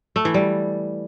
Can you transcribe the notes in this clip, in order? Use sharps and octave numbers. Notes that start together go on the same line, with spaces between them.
A3
E3
G3